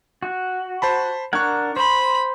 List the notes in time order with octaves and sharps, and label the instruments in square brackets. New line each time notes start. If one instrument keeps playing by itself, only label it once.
[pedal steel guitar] F#4
[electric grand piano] C5 A5 B5
[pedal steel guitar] D4 A#4 F#5 [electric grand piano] C#6 G#6
[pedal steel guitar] C5 C6 [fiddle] B5